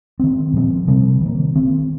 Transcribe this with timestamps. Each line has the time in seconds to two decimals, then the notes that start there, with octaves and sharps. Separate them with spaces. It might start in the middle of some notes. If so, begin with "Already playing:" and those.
0.20 D#3 C4
0.54 A#2 F3 C4
0.88 C3 G3 C4
1.21 D#3 A#3
1.56 D#3 C4